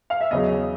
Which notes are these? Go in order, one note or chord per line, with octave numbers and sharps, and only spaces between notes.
F5
E5
E2 C#3 F#3 D#5